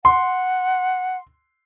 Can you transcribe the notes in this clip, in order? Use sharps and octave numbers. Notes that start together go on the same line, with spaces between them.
F#5 C6